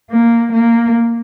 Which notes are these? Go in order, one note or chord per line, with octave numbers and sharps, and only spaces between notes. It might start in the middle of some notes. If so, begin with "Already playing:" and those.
A#3
A#3